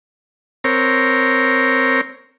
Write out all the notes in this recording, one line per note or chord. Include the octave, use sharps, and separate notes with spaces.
C4 A#4 C#5